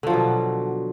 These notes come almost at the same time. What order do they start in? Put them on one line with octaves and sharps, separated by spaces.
D3 F3 F#3 B2